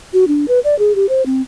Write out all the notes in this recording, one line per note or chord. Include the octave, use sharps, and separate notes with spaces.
F#4
D4
B4
D5
G#4
G4
C5
C4